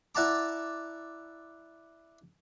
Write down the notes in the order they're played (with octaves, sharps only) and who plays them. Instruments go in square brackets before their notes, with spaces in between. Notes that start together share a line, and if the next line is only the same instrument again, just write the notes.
[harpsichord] E4 D5 F#5 A5 A#5 D6